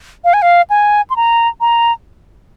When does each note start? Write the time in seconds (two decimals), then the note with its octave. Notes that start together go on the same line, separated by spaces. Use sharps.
0.24 F5
0.33 G#5
0.42 F5
0.70 G#5
1.10 C6
1.16 A#5
1.60 A#5